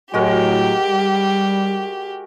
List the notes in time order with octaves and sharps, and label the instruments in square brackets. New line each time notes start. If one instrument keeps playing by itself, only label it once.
[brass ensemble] A2 F#3 [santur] G#3 F#4 A#4 [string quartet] G4
[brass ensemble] G3